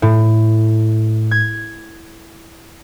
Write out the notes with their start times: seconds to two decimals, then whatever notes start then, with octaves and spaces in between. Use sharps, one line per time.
0.02 A2
1.31 G#6